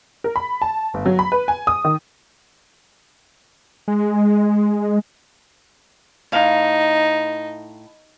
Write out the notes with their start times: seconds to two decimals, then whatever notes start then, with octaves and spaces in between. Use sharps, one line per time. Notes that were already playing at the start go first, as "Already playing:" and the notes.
0.24 A#4
0.36 B5
0.62 A5
0.94 G1
1.06 F#3
1.19 B5
1.32 B4
1.48 G#5
1.67 D#6
1.85 D#3
3.88 G#3
6.32 A2 D#4 F5